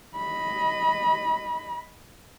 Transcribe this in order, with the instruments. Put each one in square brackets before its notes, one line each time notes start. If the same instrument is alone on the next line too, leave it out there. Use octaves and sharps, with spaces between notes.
[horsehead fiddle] D#5 B5